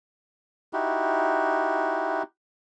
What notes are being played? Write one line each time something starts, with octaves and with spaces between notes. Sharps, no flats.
D#4 E4 F#4 G4